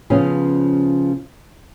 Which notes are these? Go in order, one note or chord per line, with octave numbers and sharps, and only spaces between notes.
C#3 F3 B3 C#4 G#4